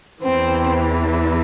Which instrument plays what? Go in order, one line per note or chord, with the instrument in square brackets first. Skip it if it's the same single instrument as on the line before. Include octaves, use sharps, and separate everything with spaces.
[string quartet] E2 E3 C4